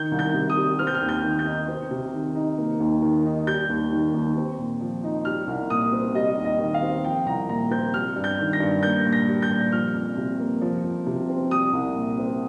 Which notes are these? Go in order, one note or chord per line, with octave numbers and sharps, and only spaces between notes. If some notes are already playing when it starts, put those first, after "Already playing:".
Already playing: D#3 G6
C2
G6
C3
D#6
G3
C4 F6
G6
F6
D#2
G6
D#3
G6
D#4
C4
C3
D#3
D#4
A#3
D#2
D#3
D#4
G3 G6
D#2
D#3
D#2
C4
A#2
F3
D#4
G3 F6
C2
A#2 D#6
C4
G3 D#5
D#2
D#5
D#3
F5
C4
F3 G5
C2 A#5
A#2 A#5
C4 G6
G3 F6
G2
G6
D#3
A#6
G2
A#3 G6
A#2
A#6
G3
G6
A#2
F3 F6
F2
C3
A#3
F3
F2
C3
C4
G3 D#6
C2
A#2
C4